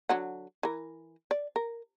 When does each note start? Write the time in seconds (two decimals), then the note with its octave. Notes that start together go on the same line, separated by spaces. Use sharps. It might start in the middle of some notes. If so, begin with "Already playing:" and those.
0.09 D3 F#3 F#5
0.63 E3 A#4
1.31 D5
1.56 A#4